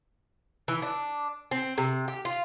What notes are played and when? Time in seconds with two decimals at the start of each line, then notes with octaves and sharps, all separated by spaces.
0.68 E3
0.82 D4
1.51 C4
1.78 C3
2.08 G4
2.25 F4